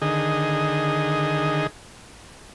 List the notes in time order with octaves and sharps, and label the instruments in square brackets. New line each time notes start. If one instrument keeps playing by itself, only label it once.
[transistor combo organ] D3 D#3 G#4 D#5